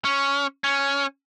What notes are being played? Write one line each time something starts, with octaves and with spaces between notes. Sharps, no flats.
C#4
C#4